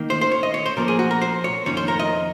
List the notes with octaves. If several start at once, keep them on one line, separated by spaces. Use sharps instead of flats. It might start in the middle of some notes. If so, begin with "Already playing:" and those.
Already playing: D#3 A#3 D#4
C5
C5
C#5
D#5
C#5
C5
A#2 F3 A#3 A#4
G#4
F#4
A#4
C5
C#5
F2 D#3 A#3 C#4 C#5
C5
A#4
D#5